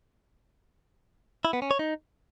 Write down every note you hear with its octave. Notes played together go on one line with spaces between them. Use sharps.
E4
B3
C#4
C#5
D#4